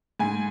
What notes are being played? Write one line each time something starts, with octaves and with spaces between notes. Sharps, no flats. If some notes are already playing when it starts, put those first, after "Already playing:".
G#2 G#5